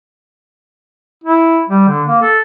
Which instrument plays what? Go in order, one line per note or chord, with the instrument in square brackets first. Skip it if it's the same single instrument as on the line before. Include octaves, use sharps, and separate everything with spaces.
[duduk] E4
G3
D3
A#3
A4